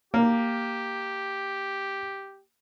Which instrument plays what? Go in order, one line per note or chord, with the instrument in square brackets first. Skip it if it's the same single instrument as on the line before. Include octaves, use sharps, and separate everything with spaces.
[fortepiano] A#3 [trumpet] G4